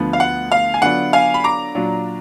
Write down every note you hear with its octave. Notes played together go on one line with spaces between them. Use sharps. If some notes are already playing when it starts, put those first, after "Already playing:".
Already playing: D2 D3 F3 B3
F5
F#5
F5
G#5
D3 F#3 B3 D4 F4 F#5
F5 G#5
B5
A#5 D6
A#2 F#3 D4 F4